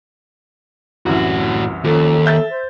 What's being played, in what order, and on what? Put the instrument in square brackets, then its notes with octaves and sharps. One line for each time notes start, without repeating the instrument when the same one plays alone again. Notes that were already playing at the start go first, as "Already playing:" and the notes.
[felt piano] C2 F#2 E3 [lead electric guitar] A2 F#4
[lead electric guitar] D#2 [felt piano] F3 C#4 [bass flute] A4
[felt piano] E5 G6 A6
[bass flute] C5